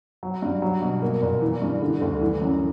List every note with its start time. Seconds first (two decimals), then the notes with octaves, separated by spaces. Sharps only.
0.23 F#3
0.42 G2
0.62 F#3
0.82 B2
1.02 A#3
1.22 A#2
1.42 E3
1.62 G2
1.82 D3
2.01 D2
2.21 E3
2.42 F#2